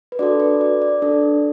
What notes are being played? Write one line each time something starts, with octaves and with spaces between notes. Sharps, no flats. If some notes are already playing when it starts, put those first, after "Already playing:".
B4
D4 F#4 A4 D5
B4
D5
D5
D4 A4